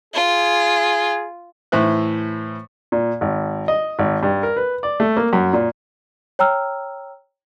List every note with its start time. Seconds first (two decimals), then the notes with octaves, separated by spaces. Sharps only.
0.14 F4 G#4
1.72 A2 E3 E4 C5 F#6
2.92 A#2
3.21 G#1
3.68 D#5
3.99 G#1
4.23 G2
4.43 A#4
4.57 B4
4.83 D5
5.00 A3
5.17 A#3
5.33 F#2
5.53 A#2
6.39 C#5 G5 A#5 E6 F6